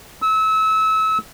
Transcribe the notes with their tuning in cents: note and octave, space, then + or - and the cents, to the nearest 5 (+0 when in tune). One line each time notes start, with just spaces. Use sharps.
E6 -30